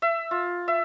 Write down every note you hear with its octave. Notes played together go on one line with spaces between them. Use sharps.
E5
F4
E5